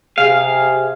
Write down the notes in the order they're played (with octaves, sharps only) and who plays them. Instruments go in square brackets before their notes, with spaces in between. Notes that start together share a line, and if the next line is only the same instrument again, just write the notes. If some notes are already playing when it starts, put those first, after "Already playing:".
[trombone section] C3 G#4 [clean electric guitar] F5